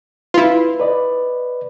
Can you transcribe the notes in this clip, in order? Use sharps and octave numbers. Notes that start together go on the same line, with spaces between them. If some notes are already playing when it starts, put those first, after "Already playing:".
E4 F4 B4
B4 D5 D#5